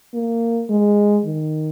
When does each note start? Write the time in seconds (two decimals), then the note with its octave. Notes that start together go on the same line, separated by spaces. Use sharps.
0.14 A#3
0.70 G#3
1.25 D#3